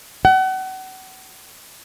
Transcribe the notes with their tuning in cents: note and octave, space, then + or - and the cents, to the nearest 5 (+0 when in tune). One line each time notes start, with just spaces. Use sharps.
F#5 +35